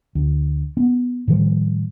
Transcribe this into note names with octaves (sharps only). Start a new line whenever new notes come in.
D2
B3 C#4
A2 D#3 F3 G3